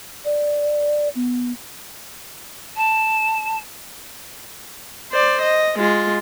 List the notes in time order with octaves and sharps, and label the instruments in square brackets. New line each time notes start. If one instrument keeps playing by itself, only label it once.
[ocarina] D5
B3
[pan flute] A5
[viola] C5 D5
D#5
G#3 F4